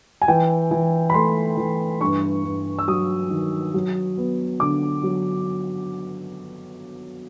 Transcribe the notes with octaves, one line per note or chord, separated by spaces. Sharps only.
G#5
E3 G5
E3
B5
A3 C6
E3
G2 C#6
G2
E6
F#3 D#6
D#3
F#3
B3
D3 D6
F#3